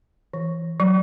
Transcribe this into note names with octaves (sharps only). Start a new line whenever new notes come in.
E3
F#3